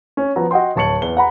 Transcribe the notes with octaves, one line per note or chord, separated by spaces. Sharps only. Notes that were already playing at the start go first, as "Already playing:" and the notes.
C#4
F3 B3 F#4 A#5
F#4 D#5 F#5 G5 C6
D1 C#5 A5 C#6 C#7 F#7
E2 G7
F#5 A#5 B5